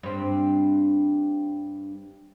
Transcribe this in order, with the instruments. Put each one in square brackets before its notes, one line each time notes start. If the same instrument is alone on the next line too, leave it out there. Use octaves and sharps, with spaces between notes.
[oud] G2 C4